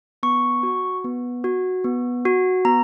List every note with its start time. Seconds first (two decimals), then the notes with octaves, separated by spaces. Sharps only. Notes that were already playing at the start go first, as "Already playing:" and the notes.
0.23 B3 C#6
0.63 F#4
1.04 B3
1.44 F#4
1.84 B3
2.25 F#4
2.65 B3 A#5